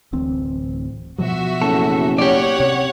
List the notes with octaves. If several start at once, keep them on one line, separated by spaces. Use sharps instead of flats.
D1 A1 C4
B2 F3 F#3 F#4 E5
F#1 A4
G4 C#5 D5 F#5
C3